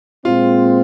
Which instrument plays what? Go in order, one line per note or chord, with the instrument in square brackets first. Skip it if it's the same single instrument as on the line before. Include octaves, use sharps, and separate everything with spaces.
[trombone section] A#2 G#3 C4 [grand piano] F4